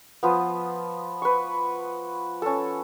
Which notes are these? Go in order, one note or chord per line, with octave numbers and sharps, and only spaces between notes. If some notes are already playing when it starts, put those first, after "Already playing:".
F3 B3
B4 C#6
C#4 A4